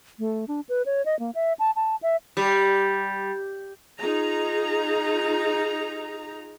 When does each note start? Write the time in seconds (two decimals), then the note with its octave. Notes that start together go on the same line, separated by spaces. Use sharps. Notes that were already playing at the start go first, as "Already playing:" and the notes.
0.19 A3
0.48 D4
0.69 B4
0.86 C#5
1.05 D#5
1.19 A#3
1.35 E5
1.59 A5
1.76 A5
2.02 E5
2.37 G3
3.98 D#4 F4 G#4 A#5